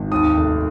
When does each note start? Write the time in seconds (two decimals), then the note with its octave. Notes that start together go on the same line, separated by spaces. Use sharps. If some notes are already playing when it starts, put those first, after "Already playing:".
Already playing: G#1
0.11 D#2 D#6
0.37 F1